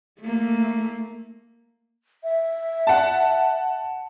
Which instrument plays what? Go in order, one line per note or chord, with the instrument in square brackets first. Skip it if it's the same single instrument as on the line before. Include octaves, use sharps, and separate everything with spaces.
[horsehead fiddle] A3 A#3
[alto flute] E5
[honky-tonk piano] F#5 A5